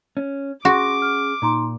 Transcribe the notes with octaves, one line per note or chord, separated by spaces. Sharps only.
C#4
C#4 F#4 G#4 F#5 C6 D6 A#6
F6
A#2 D#4 A#5 C6